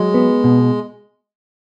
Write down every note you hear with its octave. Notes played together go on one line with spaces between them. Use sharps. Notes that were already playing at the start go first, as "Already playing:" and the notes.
Already playing: F#3 G#3
B3
B2